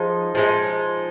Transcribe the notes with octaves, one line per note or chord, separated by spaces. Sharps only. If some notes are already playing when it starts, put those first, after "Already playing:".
Already playing: F3 G#3 D#4
F3 G#3 D#4